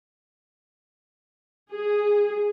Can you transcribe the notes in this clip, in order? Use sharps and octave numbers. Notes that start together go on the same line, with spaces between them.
G#4